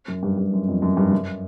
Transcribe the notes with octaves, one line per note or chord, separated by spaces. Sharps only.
F#2
G2
G2
F#2
F2
F#2
G2
F#2